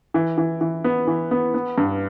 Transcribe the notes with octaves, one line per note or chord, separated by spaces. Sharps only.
E3
E3
E3
B3
E3
B3
B3
G2